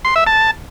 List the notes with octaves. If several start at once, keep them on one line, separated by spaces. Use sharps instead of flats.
C6
E5
A5